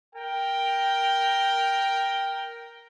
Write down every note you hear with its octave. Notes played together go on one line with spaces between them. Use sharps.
A#4 G5